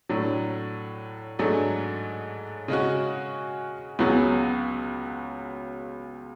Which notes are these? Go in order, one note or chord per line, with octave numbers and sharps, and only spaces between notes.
A2 F#3 A3 D4
G#2 F#3 A3 D4 G#4
C#3 G#3 C#4 F#4
C#2 C#3 F#3 B3 F#4